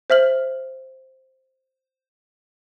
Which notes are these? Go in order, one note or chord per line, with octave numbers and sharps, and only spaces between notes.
C5 E5 F6 F#7